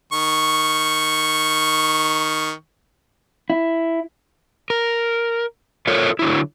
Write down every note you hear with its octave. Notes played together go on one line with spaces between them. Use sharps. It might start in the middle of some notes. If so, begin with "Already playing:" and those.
D#3 C#6
E4
A#4
F4 A4 A#4 C#5 E5 F5
D3 F#3 E4